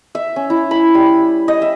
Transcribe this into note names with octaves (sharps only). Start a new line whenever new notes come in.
E5
C#4
E4
B5
G3
D#5
E5